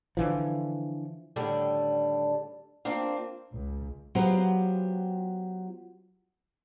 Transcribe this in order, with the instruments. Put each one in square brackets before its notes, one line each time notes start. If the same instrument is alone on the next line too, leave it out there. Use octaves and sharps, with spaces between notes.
[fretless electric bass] D3 E3 F3
[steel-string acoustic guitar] A2 D3 D#3 G3 A4 D5
A#3 C4 D4 F4
[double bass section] C#2
[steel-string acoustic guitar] F#3 B3 F4 G4 C5